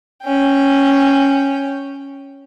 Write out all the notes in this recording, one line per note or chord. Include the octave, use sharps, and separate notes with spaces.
C#4 G5